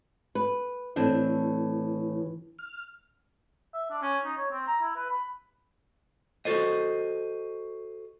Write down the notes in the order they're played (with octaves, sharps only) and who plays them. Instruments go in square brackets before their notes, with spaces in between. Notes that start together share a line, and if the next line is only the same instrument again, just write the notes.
[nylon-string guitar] B4
[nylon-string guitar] A2 C4 D4 [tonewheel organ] E3
[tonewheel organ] F6
[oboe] E5
D4
C#4
D#4
C#5
C4
A#5
E4
B4
B5
[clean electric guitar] F#4 G4 A4 C5 D#5